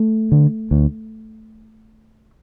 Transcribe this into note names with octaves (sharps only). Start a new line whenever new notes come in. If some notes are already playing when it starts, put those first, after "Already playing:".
Already playing: A3
D3
D2